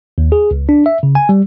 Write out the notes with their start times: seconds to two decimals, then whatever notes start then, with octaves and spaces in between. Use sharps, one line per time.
0.18 D#2
0.32 G#4
0.51 C#2
0.69 D4
0.86 E5
1.03 C#3
1.15 G#5
1.29 G3